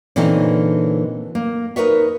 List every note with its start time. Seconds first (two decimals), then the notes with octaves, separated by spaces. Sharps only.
0.16 A#2 D3 E3 C4 C#4 D#4
1.35 A#3
1.76 D#4 A#4 B4 C#5 E5